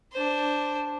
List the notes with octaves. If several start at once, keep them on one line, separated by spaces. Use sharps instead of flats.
D4 C5